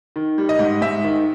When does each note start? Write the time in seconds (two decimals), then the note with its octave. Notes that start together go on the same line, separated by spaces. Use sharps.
0.16 D#3
0.38 G3
0.49 D#5
0.59 G#2
0.82 G#2 E5
1.04 D#3